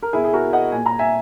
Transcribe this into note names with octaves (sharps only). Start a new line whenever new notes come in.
A#4
B2 E4 G#4
G#4
F#4 A#4
D#5 F#5
A#2 G#5
A#5
E5 G#5